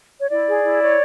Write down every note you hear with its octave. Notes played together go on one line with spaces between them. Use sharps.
C#5
E4 D5
G#4
E4
C#5